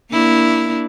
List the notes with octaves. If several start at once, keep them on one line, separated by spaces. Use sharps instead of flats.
A#3 D4 E4